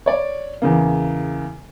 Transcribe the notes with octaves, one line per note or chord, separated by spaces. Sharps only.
C#5 D5
E2 C#3 A#3